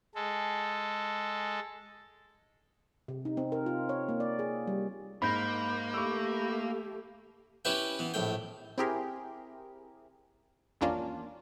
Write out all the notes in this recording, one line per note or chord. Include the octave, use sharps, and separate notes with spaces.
G#3 A4
C3
D#4
C4
A#4
F4
C#5
A#3
D5
G#4
G3
G#2 A#3 B5 G6
A3 G4 C#6 D6 E6
C#4 E4 G4 B4 E5 G5
E3 B3
A#1 A2 G5
C4 E4 G4 G#4 A#4
G#1 E2 A#3 C#4 D4 F4